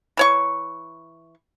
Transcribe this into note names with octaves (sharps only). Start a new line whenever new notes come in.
E3 C#5 C#6